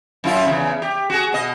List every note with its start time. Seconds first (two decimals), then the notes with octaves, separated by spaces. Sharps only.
0.24 F#2 E4 F4
0.46 E2 G#2 C#3
0.82 G4
1.10 F#4 G#4
1.33 B2 D#5